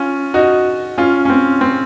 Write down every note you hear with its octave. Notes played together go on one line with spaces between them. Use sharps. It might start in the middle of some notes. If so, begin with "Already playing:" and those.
Already playing: C#4 F4
D#4 F#4
C#4 F4
C#4
C4
C4